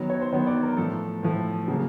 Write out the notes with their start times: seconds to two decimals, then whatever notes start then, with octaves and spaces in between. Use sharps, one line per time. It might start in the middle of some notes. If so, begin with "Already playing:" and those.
Already playing: D#3 F#3 B3
0.10 C#5
0.21 C5
0.32 D#3 F#3 B3 C#5
0.47 D5
0.63 A#4
0.77 A2 F3 A3 A4
1.23 A2 F3 A3
1.68 C#3 F#3 A#3